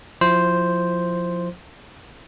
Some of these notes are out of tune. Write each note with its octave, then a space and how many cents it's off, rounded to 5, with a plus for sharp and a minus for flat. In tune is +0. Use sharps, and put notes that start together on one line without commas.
F3 +25 E4 +30 C5 +0